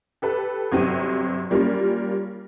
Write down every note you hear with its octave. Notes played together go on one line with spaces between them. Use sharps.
G4 A4 B4
G1 C3 F#3 C4 D#7
G3 A#3 C#4 F4